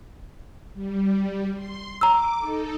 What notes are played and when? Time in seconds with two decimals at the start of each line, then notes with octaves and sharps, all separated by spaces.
0.74 G3
1.54 C6
2.01 A#5 D6 E6
2.38 D#4 A4